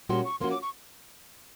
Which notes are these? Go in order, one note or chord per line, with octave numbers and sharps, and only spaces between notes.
A#2 G3 A#3 C#4 F#4 C6
C#6
F3 A#3 C#4 F#4 C6
D6
C#6